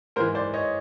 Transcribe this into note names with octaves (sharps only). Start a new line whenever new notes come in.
G#2 E3 A#4 C5
C5 D5
C#5 D#5